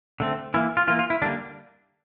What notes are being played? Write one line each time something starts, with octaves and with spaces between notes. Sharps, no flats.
D3 A3 C4
E3 A#3 E4
F4
E3 A#3 F4
F4
E4
D3 G3 A#3 D4